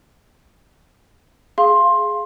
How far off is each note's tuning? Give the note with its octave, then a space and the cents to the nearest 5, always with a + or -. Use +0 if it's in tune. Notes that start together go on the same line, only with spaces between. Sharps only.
G#4 +10 F5 -10 C6 +15